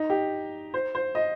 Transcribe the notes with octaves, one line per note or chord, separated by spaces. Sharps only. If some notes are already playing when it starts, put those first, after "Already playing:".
Already playing: D#4
G4
C5
C5
D#5